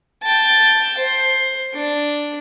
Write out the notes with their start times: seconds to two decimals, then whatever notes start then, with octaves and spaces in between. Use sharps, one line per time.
0.23 G5 A5
0.97 C5
1.73 D4